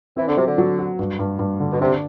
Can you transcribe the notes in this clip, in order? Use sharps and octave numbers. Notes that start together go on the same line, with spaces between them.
E3 C4
D3
C3 F#3
D3
F#3
F#4
G2
G2
G2
D3
B2
C3 D4